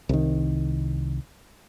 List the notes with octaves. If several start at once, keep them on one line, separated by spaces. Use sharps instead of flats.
C2 D#3